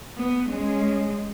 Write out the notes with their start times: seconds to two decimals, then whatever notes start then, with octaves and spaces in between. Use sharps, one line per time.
0.18 B3
0.49 G#3 C#4